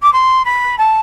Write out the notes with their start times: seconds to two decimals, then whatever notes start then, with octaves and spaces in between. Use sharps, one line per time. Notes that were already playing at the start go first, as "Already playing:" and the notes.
0.02 D6
0.12 C6
0.44 B5
0.78 A5